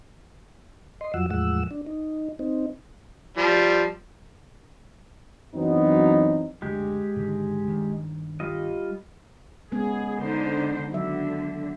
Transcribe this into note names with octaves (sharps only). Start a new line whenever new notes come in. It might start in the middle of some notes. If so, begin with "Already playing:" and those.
D#5 C6
F2 F3 F#3 F#5 E6
E2 A2 F3 G#3 F#5 E6
D4
D#4
C4 D#4
F3 G3
F#2 E3 F#3 B3 C4 D#4
F#1 D2 D3 G#3 G4
G#2 D3 D#3
G2 D#3
G3 F4 D#5
G#3 B3 C#4 G#4
D3 D#4 C5
D3 D#3 F#3 E5